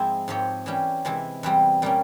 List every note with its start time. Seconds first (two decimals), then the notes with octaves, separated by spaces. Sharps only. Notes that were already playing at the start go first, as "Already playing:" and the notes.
Already playing: G#2 F3 G#3 C4 E4
0.28 G#2 F3 C4 G4 C#5
0.66 E3 G3 C#4 G4
1.05 C3 E3 G#3 E4
1.43 E2 E3 G3 C4
1.82 A#2 G3 A#3 C#4